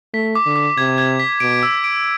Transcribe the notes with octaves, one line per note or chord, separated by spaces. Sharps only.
A3 B6
D6
D3
D6
C3 G#6
G#6
B6
B2 D7
E6
D7